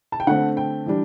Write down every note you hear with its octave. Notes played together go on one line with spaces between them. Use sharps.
A5
G5
D3 A3 C4 F#5
G5
E3 G3 D4